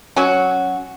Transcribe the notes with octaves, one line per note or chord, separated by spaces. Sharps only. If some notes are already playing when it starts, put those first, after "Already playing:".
F#3 C#4 F#4